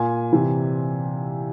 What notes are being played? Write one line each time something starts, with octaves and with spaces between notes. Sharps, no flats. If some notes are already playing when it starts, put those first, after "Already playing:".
Already playing: A#2 G#5
C3 E3